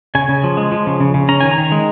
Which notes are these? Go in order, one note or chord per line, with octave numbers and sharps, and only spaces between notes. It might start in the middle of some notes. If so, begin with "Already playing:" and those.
C#3 G#5
C#3
F3
G#3
F3
C#3
C#3
C#3
C#4 A#5
D#3 G#5
A#5
D#3
G#3